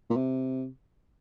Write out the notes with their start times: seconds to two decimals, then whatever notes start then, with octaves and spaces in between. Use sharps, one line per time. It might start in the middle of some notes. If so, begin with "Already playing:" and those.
0.10 A#2
0.16 C3